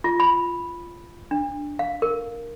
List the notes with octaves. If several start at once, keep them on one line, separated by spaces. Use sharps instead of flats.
F4
B5
D4
F5
A#4